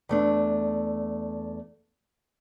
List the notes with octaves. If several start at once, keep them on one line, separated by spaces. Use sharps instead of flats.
E2 A3 D4